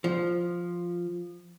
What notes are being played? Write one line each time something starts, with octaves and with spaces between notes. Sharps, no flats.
F3